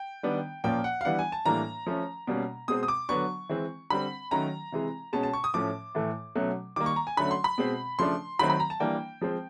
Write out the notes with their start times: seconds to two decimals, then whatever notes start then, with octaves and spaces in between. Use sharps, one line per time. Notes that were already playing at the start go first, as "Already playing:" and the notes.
Already playing: G5
0.23 D#3 G3 B3 D4
0.64 A#2 F3 A#3 C#4 G5
0.84 F#5
1.01 F5
1.05 E3 G3 B3 D4 F#5
1.19 G#5
1.32 A5
1.46 A2 E3 G3 A#3 D4 A#5
1.87 F3 A3 C#4
2.27 B2 G3 A#3 C#4
2.68 B2 G#3 C4 D#6
2.83 D#6
2.88 D6
3.09 D3 F#3 B3 D4 C#6
3.49 E3 G#3 C4
3.90 D3 G3 C4 B5
4.31 D#3 F#3 A3 C#4 A#5
4.72 C3 E3 G#3
5.13 B2 G#3 C#4 A5
5.23 A5
5.33 C#6
5.44 D#6
5.54 A2 F3 A3 C#4 D6
5.95 A2 E3 A3
6.36 B2 F#3 A3 C#4
6.76 D#3 G3 A#3 D6
6.86 C#6
6.96 A#5
7.07 G#5
7.17 D3 F#3 A3 C#4 B5
7.31 C6
7.44 B5
7.58 B2 G#3 C4
7.99 C#3 F3 A3 D4 C6
8.39 D#3 F#3 A3 C4 B5
8.50 B5
8.60 A#5
8.70 A5
8.80 E3 G3 A#3 D4 G5
9.21 F3 G#3 C4